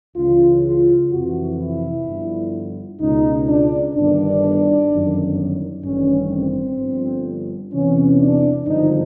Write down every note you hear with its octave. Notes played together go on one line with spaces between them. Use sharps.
C#2 C#3 E3 F4
F4
F2 C3 E3 F#4
E4
G1 G2 D3 F3
C#2 B2 D#4
D4
G1 G2 D#3 D4
G1 F#2 D#3
A1 G2 D#3 C#4
C4
G1 G2 D3 F3
E2 C3 E3 C#4
D4
G#1 G2 D3 F3 D#4